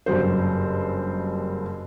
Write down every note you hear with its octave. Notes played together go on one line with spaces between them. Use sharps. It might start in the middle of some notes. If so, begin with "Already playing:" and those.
F#1 G2 F#3 C5